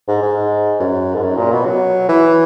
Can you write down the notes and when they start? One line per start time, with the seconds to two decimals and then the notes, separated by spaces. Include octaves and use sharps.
0.08 G#2
0.22 G#2
0.80 F#2
1.15 G#2
1.23 F#2
1.37 A#2
1.52 B2
1.66 F#3
2.09 E3